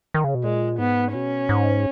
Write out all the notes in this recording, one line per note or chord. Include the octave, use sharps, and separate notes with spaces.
D#3
C#3
B2
A#2 G#3
G#2 B3
B2 C#4
G#2